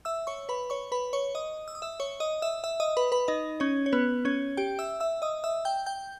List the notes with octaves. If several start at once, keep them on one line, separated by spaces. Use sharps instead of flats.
E5 E6
C#5 C#6
B4 B5
C#5 C#6
B4 B5
C#5 C#6
D#5 D#6
E6
D#6
E5 E6
C#5 C#6
D#5 D#6
E5 E6
E5 E6
D#5 D#6
B4 B5
B4 B5
D#4 D#5
C#4 C#5
C#5
B3 B4
C#4 C#5
G4 G5
E5 E6
E5 E6
D#5 D#6
E5 E6
G5 G6
G5 G6